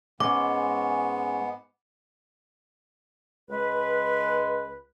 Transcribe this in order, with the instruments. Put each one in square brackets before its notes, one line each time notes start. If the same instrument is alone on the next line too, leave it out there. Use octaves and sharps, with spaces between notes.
[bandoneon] G#2 B3 [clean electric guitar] G#3 C#4 [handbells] D6
[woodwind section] C#2 G#3 B4